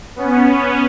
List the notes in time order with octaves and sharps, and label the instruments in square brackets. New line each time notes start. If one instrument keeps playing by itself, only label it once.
[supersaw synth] B3 C#4